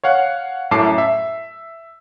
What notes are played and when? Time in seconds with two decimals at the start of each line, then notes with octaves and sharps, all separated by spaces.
0.04 C#5 F5 F#5
0.71 F#2 A2 A5 D6 C7
0.98 E5